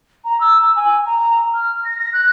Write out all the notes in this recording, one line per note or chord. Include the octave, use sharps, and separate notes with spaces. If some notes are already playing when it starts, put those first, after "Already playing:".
A#5
E6
G#5
A#5
F6
A#6
A#6
F#6